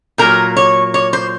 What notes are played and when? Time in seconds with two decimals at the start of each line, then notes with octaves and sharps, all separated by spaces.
0.18 A#2 F#3 A#4
0.57 C#5
0.94 C#5
1.13 C5